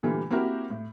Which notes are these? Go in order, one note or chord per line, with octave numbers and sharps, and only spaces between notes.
A#2 D3 E3 G3 A3 A#3
A#3 C4 E4 F#4 G4 A#4
A2